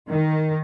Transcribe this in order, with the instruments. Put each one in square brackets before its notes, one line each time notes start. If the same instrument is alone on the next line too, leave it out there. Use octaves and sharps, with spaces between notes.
[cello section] D#3